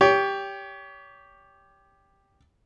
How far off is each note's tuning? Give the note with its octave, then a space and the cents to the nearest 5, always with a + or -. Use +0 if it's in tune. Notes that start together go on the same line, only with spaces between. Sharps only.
G4 +5 C#5 +30